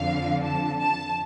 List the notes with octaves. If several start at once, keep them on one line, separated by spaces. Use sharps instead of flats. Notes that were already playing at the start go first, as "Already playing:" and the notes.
Already playing: F2 D3 F3 F5
A5
A5